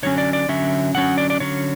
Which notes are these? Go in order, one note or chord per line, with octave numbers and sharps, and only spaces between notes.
D3 F#3 C#4 C#5
D5
D5
D3 F#3 C#4 E5
D3 F#3 C#4 F#5
D5
D5
D3 F#3 C#4 C#5